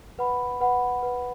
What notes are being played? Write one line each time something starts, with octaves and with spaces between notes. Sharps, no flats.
B4 F#5 B5
B4 F#5 B5
B4 F#5 B5